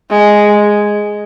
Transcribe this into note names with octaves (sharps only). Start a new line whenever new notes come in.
G#3